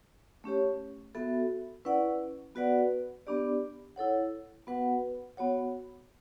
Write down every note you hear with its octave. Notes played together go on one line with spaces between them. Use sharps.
A3 C#4 G4 C#5
B3 F#4 A4 E5
C#4 E4 B4 D5 F#5
B3 F#4 B4 D5 F#5
B3 D4 G4 D5
E4 A4 C#5 F#5
B3 F#4 B4 F#5
B3 F#4 C#5 F#5